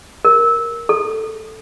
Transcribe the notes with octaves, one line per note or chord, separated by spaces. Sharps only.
A#4
A4